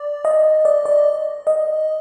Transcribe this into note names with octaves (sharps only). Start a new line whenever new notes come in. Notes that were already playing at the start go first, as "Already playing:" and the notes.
Already playing: D5
D#5
D5
D5
D#5